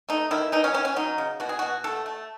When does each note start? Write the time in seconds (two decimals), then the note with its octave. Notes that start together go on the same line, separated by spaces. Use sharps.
0.09 A3 D#4
0.31 D#3 E4
0.52 E3 D#4
0.64 C#4
0.74 E3 C#4
0.85 C#4
0.96 F#3 D#4
1.18 C#3
1.40 B2 F#4
1.49 G#4
1.59 B2 F#4
1.84 A3 A4
2.06 A3